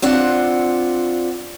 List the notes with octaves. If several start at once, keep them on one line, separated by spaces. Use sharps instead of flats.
C4 D4 F4 F#5